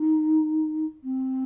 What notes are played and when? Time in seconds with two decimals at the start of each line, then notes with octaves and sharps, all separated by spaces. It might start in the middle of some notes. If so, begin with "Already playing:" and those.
Already playing: D#4
1.03 C4